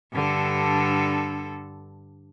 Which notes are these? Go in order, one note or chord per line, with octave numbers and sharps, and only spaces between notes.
G2 D3 A4